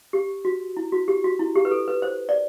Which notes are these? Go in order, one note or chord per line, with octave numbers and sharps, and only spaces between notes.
G4
F#4
E4
F#4
G4
F#4
E4
G4
B4
A4
B4
C5
D5